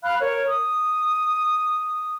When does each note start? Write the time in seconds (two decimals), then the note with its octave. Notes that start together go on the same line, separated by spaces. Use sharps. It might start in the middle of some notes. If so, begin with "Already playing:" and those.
0.04 F5 B5 F6 F#6
0.20 A#4 C#5
0.46 D#6